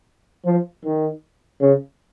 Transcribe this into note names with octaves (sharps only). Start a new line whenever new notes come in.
F3
D#3
C#3